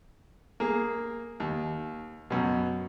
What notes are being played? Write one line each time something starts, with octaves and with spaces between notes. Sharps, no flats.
A#3 G#4
D#2
F#2 B2